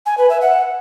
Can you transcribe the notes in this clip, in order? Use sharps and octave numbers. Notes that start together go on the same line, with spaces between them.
G#5
B4
E5
F#5